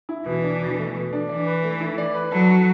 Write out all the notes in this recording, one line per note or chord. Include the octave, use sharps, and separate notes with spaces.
E4
B2 E3
D4
B2
A3
B2
D4
E3 D5
B4
A3
E4
D5
B4
F#3 A4
F#4